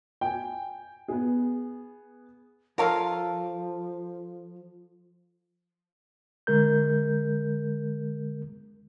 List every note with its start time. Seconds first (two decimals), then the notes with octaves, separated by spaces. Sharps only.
0.21 G5 G#5
1.08 B3 G#4
2.78 F3 F4 A4 A#4 C#5 F5
6.47 D3 G#3 A#4 G6